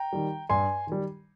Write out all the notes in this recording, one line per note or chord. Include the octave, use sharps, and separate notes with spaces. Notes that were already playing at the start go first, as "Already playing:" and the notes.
Already playing: G5 A#5
D#3 G3
G2 G#5 C6
D#3 G3